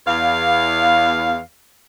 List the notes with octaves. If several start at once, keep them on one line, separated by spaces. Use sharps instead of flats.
E2 F5